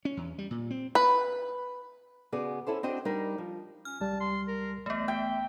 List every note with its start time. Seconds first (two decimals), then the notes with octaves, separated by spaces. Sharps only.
0.05 C#4
0.17 E2
0.38 G3
0.51 A#2
0.71 C4
0.95 B4
2.32 C#3 B3 F#4 G#4 D5
2.67 C#4 E4 A4 C5
2.83 C4 D4 F#4 C5 D#5 G5
3.05 G3 D4 D#4 A#4
3.38 F3
3.85 C#4 F6
4.00 C2 G3 A5
4.20 C6
4.48 A#4
4.86 A1 A3 B3 D#5
5.08 E5 G5